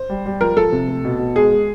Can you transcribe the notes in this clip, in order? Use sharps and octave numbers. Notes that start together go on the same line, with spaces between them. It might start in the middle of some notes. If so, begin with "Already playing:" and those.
Already playing: C5
G3
G3
F3 A#4
F3 A4
C3
A3
B2
B2
G#3 G#4
G#3